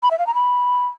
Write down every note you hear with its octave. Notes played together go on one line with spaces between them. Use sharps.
B5
E5
F5
A#5
B5